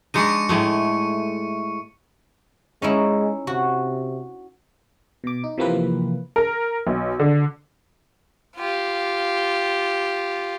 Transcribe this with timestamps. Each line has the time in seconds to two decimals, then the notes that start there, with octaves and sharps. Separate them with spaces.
0.14 G#3 D4 D#4 C#6 C#7 D#7
0.49 A2 G#3 A3
2.82 G#3 C#4 D#4 E4
3.47 C3 F#4
5.24 B2 D6
5.44 D#4
5.58 C3 E3 F3 A#3 C4 B4
6.36 A#4
6.87 B1
7.20 D3
8.56 F4 G4